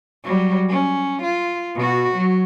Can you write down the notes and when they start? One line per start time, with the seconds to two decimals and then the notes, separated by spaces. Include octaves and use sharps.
0.24 F#3 G3
0.69 C#4
1.22 F4
1.75 B2 F#4
2.15 F#3